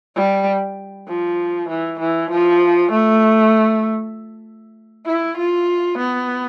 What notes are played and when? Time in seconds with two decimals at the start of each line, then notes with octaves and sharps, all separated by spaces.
0.16 G3
1.08 F3
1.69 E3
2.00 E3
2.31 F3
2.92 A3
5.06 E4
5.37 F4
5.98 B3